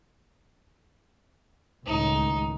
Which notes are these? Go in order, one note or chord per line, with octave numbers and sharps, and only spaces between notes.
C#2 A2 D#3 D#4